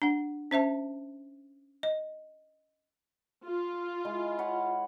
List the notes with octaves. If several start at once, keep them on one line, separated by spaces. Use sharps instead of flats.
D4 F#5
C#4 C5 E5 A5
D#5
F4
G#3 E4
C#5 F#5 B5